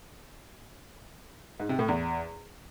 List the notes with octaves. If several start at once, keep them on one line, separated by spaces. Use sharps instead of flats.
G#2
C3
A2
E2